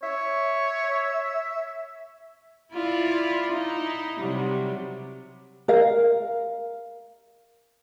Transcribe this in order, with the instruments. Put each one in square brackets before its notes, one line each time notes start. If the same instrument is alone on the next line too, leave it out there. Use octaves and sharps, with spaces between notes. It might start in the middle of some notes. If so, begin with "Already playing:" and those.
[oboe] C#5 [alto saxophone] E5
[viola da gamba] E4 F4 D5
D#4 E4
C3 F#3 G3
[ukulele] A#4 F5